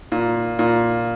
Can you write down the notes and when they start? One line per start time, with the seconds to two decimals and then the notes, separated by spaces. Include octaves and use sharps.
0.12 A#2
0.59 A#2